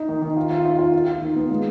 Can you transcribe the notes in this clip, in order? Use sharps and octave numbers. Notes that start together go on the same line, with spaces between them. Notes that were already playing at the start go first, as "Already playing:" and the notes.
Already playing: D#4
D#3
D#3
F4
F4
F4
F4
F4
F4
D#3
B3
G#3